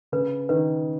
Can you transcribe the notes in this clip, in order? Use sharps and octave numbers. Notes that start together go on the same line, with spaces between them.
C#3 B4
D#3 B4